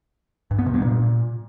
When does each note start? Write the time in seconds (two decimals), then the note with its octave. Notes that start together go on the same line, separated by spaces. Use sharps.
0.51 G2
0.59 B3
0.66 C3
0.74 G2
0.82 A#2